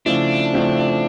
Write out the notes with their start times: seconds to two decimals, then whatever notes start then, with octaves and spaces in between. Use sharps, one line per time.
0.06 C#3 F3 A3 C4 D4 E4
0.53 C#3 F3 A3 C4 E4